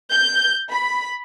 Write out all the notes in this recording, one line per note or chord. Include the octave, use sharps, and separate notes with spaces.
G6
B5